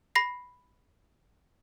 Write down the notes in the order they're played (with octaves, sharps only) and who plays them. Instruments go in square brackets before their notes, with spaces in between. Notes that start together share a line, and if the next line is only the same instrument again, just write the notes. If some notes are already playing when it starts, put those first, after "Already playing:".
[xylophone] B5 A#6 C7